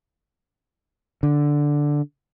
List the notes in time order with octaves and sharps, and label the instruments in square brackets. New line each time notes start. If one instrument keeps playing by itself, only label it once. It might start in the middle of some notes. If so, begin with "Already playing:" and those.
[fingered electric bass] D3